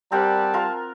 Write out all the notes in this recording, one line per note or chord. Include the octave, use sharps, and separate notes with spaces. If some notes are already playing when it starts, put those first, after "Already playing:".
G3 C4 A#4 F#5 A5
F4 A#4